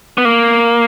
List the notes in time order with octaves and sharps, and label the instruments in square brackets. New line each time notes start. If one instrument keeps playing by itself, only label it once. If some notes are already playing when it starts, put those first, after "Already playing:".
[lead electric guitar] B3
A#3